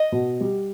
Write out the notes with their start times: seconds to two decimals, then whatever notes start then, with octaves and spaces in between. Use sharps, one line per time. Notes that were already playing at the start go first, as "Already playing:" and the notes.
Already playing: D#5
0.12 B2
0.41 G3